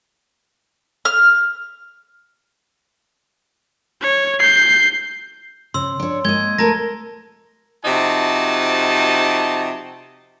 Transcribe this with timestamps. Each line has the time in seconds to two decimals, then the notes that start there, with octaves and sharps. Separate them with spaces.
1.05 F6
4.01 C#5
4.39 G6 C7
5.74 C#3 C5 C6 E6
6.00 D4 C#5
6.25 G#3 A#3 D#5 G#6 G7
6.58 A3 A#4 B4 A5 A#5 A#6
7.85 C3 F3 D#4 F#4 A5